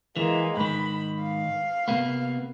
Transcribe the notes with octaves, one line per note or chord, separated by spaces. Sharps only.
E3 G#3 A#3
G#2 D#3 B5
F5
C3 A#3 B3